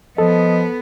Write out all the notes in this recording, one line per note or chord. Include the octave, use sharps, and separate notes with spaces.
F3 B3 A4 D#5